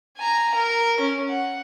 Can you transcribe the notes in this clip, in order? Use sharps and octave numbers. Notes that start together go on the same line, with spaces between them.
G#5 A#5
A#4
C#4
F#5